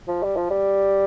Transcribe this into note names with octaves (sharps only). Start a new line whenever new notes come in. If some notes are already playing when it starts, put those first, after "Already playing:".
F3
G3
F3
G3